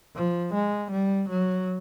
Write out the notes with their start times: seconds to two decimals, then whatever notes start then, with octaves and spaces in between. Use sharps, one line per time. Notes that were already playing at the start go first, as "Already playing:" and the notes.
0.16 F3
0.54 G#3
0.92 G3
1.29 F#3